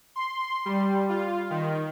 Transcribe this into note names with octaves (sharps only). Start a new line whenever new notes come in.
C6
G3
F4
D#3